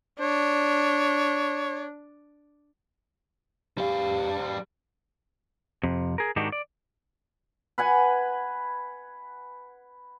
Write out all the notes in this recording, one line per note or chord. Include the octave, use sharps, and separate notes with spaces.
D4 C#5
G3 G4 F5
F2 C3
G#4 A#4
G#2 D#3 D4 D#4 F#4 G4
D5
B4 F#5 G#5